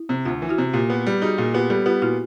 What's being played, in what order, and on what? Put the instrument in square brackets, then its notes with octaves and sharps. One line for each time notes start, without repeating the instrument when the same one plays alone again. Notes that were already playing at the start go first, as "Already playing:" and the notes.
Already playing: [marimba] E4
[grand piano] C3
[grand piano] D2 [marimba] F4
[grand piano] E3
[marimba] E4 F#4
[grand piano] C3
[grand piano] A#2 [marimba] F4 G4
[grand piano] B3
G3
[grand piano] D#4 [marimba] F#4 G#4
[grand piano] A#2 [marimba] F#4 G#4
[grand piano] B3 [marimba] F4 G4
[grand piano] G3 [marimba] G4 A4
[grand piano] B3 [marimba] F4 G4
[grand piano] A#2 [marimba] E4 F#4